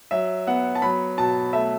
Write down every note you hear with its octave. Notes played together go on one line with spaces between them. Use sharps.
F#3 E5
B3 F#5
A5
F#3 B5
B2 A5
A3 E5